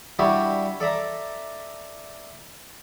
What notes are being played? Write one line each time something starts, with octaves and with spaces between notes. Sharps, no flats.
G3 D4 E4 F#4 G4 E5
A4 D5 E5 A#5